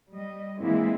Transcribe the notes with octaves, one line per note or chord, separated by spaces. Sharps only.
G3 D#5
E3 G#3 A#3 C4 E4